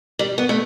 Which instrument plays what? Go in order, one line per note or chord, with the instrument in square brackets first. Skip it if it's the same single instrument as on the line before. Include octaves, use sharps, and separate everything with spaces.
[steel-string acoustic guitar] G3
B3
A3